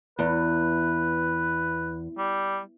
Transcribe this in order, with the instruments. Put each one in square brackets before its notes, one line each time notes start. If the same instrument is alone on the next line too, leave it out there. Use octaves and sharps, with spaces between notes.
[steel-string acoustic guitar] E2 [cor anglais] B4
[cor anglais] G3